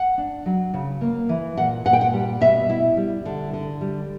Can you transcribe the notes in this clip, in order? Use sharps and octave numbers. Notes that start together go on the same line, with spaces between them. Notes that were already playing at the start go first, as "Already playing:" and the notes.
Already playing: F#5
D4
F#3
C#3
A#3
E3
A#2 F#5
A#2 F#5
G5
F#5
G3
B2 E5
E4
G3
D3
D3
G3